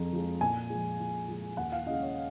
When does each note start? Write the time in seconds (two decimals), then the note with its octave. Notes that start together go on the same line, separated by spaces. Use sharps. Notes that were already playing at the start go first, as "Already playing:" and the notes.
Already playing: F2 F3 G#3 A#5
0.13 F3 G#3
0.41 A#2 G#5
0.70 F3 G#3
1.00 A#2
1.28 F3 G#3
1.57 D#2 F#5
1.72 F5
1.86 C#3 G#3 D#5
2.01 C#5